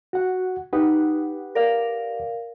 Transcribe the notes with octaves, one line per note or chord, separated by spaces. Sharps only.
F#4 F#5
D#4 G4 B4 F#5
A#4 D5 F5